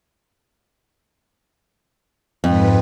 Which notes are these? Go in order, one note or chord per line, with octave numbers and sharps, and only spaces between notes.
F2 G#2 B4